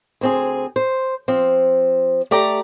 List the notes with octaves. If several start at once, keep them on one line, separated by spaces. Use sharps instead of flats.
D2 C4 G#4
C5
F3 C4
A3 G4 D5 A#5